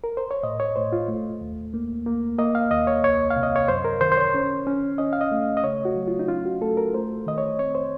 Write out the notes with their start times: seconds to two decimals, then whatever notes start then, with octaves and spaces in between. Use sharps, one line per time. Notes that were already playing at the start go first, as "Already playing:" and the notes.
0.04 A#4
0.17 C5
0.31 C#5
0.43 A2 D#5
0.60 C#5
0.76 A2 C5
0.92 F4
1.08 A3
1.41 D#2
1.74 A#3
2.06 A#3
2.39 A#3 D#5
2.55 F5
2.71 D#2 D#5
2.87 C#5
3.03 C2 C#5
3.31 F5
3.36 C3
3.43 D#5
3.56 C#5
3.68 F#2 C5
3.85 A#4
4.01 D#3 C5
4.12 C5
4.17 C#5
4.34 C#4
4.67 C#4
4.98 C#4 D#5
5.13 F5
5.21 D#5
5.32 A3
5.57 D#5
5.63 C#3 C#5
5.85 F#4
5.96 F#3
6.08 F4
6.19 D#4
6.28 C#4 F4
6.45 F#4
6.61 A3 A4
6.77 A#4
6.94 A3 C5
7.26 D#3 D#5
7.38 C#5
7.59 C4 C#5
7.75 C5